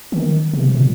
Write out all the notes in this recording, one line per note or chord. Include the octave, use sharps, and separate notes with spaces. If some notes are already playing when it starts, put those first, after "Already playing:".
D#3
C3
A#2